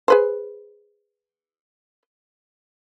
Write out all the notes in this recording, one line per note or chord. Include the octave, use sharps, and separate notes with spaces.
G#4 B4 C5